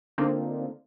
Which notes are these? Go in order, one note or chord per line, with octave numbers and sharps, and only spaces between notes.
D3 A#3 C4 D4 D#4 F4